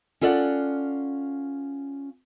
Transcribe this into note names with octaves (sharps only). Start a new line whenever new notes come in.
C#4 F4 A4 D5 F5 F#5